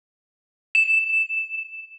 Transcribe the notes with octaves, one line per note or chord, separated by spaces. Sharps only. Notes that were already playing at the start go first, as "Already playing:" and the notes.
E7